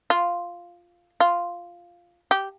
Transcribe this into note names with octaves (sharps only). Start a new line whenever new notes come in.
F4
F4
G4